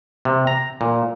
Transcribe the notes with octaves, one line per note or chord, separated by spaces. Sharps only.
C3
A#5
A#2